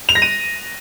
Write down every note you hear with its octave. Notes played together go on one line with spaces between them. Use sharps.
F7
A#6
D#7